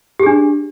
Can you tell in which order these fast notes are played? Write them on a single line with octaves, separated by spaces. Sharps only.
G4 G#4 D4